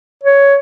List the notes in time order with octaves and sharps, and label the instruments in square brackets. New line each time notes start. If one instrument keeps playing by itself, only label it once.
[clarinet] C#5